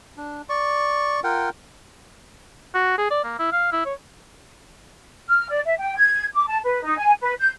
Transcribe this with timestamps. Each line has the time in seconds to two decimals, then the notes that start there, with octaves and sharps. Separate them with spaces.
0.17 D4
0.49 D5 C#6
1.24 F4 A#4 F#5 G5
2.75 F#4
2.98 G#4
3.10 D5
3.24 A#3
3.39 E4
3.52 F5
3.73 E4
3.86 C#5
5.28 F6
5.49 D5
5.65 E5
5.78 G5
5.97 G#6
6.34 D6
6.46 A5
6.64 B4
6.83 D#4
6.97 G#5
7.21 B4
7.39 G6